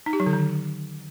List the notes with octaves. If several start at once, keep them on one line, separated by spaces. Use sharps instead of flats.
D#4
G4
F#3
D3
D#3